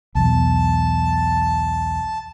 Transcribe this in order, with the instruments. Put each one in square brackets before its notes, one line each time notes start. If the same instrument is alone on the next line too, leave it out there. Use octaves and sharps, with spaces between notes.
[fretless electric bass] B1 E2 [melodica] A5